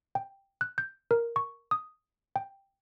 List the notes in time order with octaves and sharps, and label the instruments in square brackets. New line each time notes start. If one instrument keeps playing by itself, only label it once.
[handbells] G5
F#6
G6
A#4
C#6
D#6
G5